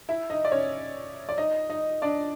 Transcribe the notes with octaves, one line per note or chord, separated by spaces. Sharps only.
E4 E5
D#4 D#5
D5
C#4 C#5
D5
D#4 D#5
D#4 D#5
D4 D5